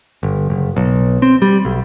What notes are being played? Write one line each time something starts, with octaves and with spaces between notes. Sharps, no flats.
G1
F#1
B1
C4
G3
B1